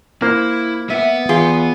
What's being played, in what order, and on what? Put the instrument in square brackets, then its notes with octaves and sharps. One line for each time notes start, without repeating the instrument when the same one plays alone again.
[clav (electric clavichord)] A#3 C5 [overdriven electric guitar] E4
[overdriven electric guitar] B3 F#5 [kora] E5
[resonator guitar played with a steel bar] E2 F4 [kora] G#4